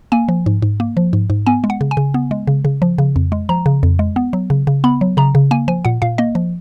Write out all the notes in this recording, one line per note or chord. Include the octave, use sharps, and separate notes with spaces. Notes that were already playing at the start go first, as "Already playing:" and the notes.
A#3 G#5
F3
G#2
G#2
A#3
F3
G#2
G#2
B3 G#5
G#3
F#5
C#3
G#5
C#3
B3
G#3
C#3
C#3
F3
C#3
F2
G#3
F3 A#5
C#3
F2
G#3
B3
F#3
C#3
C#3
B3 B5
F#3
C#3 A#5
C#3
A#3 G#5
F3 G#5
A#2 F#5
A#2 F5
A#3 D#5
F3